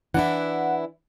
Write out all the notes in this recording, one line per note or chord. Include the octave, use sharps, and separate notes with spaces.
E3 D4 E4 F#5